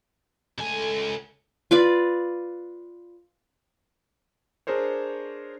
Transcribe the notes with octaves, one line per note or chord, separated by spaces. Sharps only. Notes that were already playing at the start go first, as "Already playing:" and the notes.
C#2 A3 A4 G#5
F4 B4 D5
D4 G#4 A#4 C5 C#5